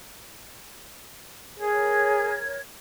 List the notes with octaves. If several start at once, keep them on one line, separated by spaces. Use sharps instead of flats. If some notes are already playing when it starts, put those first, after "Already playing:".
G#4 A#4 C#5 G#6